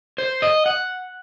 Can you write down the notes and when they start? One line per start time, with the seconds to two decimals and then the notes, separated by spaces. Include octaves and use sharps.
0.18 C5
0.42 D#5
0.66 F#5